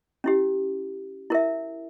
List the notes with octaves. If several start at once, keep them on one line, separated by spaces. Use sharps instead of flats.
C#4 E4 G4
E4 A#4 E5